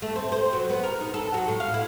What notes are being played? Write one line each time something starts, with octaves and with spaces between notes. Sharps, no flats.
A3
C4
C5
F#3
B3
A#4
D#4
A4
F#3
A2
F5
E4